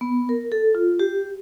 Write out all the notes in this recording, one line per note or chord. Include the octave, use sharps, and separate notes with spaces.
B3
A#4
A4
F4
G4